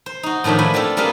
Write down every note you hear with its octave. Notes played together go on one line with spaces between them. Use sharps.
C5
D#4 F#4
A2 D#3 F3 D4 E5
A3 D4 E4 B4 G#5
C4 D4 F4 A4
G3 A#3 C4 F4 G#4 B4